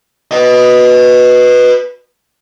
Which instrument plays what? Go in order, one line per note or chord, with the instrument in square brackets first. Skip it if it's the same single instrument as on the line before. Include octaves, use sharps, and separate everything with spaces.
[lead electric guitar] B4 D#5